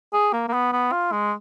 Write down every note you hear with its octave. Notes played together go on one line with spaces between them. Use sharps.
G#4
A#3
A#3
B3
B3
F4
G#3